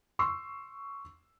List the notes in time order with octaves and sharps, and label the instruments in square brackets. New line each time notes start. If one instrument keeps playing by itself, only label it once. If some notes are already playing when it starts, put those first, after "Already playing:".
[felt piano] C6 C#6 E6 C7